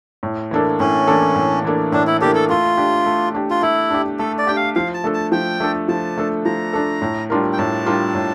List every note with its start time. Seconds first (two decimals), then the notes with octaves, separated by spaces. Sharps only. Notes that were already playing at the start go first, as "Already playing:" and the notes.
0.23 A2
0.51 E3 A#3 D4 A4
0.80 A2 C#4
1.08 E3 A#3 D4 A4
1.36 A2
1.64 E3 A#3 D4 A4
1.92 A2 D4
2.07 E4
2.21 E3 A#3 D4 G4 A4
2.35 A4
2.49 A3 F4
2.78 D4 G4
3.06 A3
3.35 D4 G4
3.50 F4
3.62 A3 E4
3.91 D4 G4
4.19 A3 A4
4.38 D5
4.47 D4 G4 G5
4.56 F5
4.75 F3 F5
4.94 A5
5.04 A3 D4 A4
5.14 A5
5.32 F3 G5
5.60 A3 D4 A4
5.88 F3 A5
6.17 A3 D4 A4
6.45 F3 A#5
6.73 A3 D4 A4
7.02 A2
7.30 G3 D4 F4 A#4
7.53 G5
7.58 A2 A5
7.86 G3 D4 F4 A#4
8.15 A2